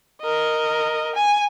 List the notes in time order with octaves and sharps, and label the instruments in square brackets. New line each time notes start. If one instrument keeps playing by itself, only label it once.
[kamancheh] A#4 D#5
G#5